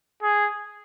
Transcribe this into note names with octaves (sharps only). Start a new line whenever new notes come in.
G#4